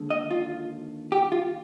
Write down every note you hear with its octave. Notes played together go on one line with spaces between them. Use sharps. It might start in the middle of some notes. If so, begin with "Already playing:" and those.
Already playing: D#2 D3 G#3
D#5
F4
G4
F4